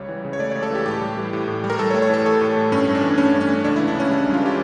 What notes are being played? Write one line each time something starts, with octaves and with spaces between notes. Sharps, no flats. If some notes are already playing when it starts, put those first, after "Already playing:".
Already playing: C#2 G3 C#5
E3
C#3
C#5
A3 D5
C#5
C#2
A4
E3 G4
A2 G4
G3
E3
A2
A2
G3
A#4
A2 A4
C#5
A3
C#5
E3 A4
A2 A4
A2
A3
G2 C#4
A3
D4
E3
G2 C#4
G2
C#4
A3
C#2 D4
E4
E3
D4
C#3 C#4
G3 D4
C#2
F4
E3 G4